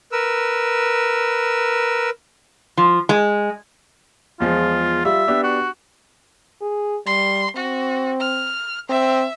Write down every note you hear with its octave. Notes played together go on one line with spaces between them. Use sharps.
A#4 B4 E6
F3
G#3
E2 F3 G#3 F4
G3 F4 E5
B3 D4 G4
F#4
G#4
G3 C6
C4 F#4
F6
C4 E5